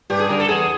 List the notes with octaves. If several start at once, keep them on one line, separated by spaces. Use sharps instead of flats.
G2 G4
G#4
D3 G3 A#4
A4
E2 G#4